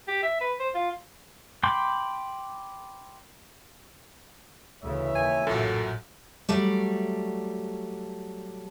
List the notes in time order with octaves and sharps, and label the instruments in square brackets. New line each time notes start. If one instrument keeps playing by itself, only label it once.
[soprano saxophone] G4
E5
B4
C5
F4
[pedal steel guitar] G5 B5 C6 D6 G6
[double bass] D2 C#3 [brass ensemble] E3 C#5 E5
[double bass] D#2 [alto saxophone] G#5
[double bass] A1 [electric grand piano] F#2 A#2 F#3 [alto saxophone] A4
[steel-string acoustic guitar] F#3 G3 A3 D5